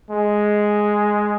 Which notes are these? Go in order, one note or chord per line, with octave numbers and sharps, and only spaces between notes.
G#3